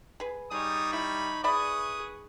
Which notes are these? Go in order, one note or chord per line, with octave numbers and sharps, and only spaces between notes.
G#4 B4
G3 D#4 G#4 C#5 D#6
E4 B5
G#4 B4 D5 E5 B5 C#6 D#6